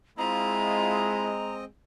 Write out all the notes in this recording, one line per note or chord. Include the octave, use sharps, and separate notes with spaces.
G#3 C4 E4 F4 D#5 A#5